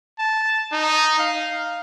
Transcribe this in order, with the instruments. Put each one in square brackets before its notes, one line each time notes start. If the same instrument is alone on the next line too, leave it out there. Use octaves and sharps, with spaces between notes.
[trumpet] A5
D#4
F5